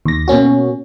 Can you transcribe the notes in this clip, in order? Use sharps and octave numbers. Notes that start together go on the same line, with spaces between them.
D#2 A#6
B2 A#3 C#4 F#4